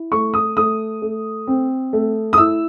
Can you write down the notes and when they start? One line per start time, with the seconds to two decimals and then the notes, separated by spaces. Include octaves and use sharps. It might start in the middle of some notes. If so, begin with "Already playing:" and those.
Already playing: E4
0.12 A3 C#6
0.34 D#6
0.57 A3 D#6
1.02 A3
1.47 C4
1.93 A3
2.33 D#6
2.38 E4 E6